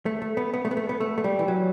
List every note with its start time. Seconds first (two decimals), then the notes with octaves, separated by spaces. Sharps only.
0.06 A3
0.22 A3
0.37 B3
0.54 B3
0.65 A3
0.71 B3
0.77 A3
0.89 B3
1.00 A3
1.18 A3
1.24 G3
1.39 E3
1.48 F#3